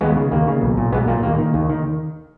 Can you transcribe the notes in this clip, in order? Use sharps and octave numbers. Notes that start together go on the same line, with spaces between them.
D#2 G#3 B3
C#3
D#2 A#3
C#3
B1
A#2
B1 G#3 B3
A#2 A#3
D#2 A#3
D#3
D#2
D#3